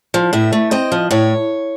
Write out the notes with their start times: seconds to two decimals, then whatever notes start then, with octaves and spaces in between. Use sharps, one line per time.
0.14 F3
0.33 A2 E5
0.53 A3
0.71 C4 D#5
0.92 F3
1.11 A2 C#5